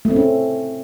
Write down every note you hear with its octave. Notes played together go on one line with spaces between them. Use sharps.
A3
C4
C#4